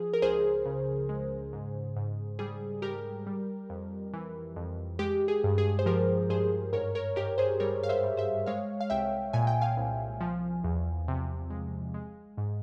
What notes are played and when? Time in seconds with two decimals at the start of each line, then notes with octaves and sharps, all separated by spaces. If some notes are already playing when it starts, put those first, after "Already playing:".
Already playing: F3 G#4
0.13 A#4
0.22 C#2 G#4 C5
0.66 C#3
1.09 G#3
1.53 G#2
1.96 G#2
2.39 G3 G#4
2.82 G3 G4 A#4
3.27 G3
3.70 F2
4.13 E3
4.56 F2
4.99 G#3 G4
5.28 G#4
5.44 G2
5.58 G#4
5.79 C5
5.86 F3 G4 A#4
6.29 G2 G#4 C5
6.73 G#2 A#4 C#5
6.95 A#4 C#5
7.16 G#2 G4 A#4
7.38 G#4 C5
7.60 G3 A#4 C#5
7.83 F5
7.89 C5 E5
8.03 G3
8.17 C5 E5
8.46 G#3 C#5 F5
8.80 F5
8.90 C2 E5 G5
9.33 A#2 G#5
9.47 G5
9.61 F5 G#5
9.77 C2
10.21 F3
10.64 E2
11.08 C3
11.50 G#3
11.94 G#3
12.37 G#2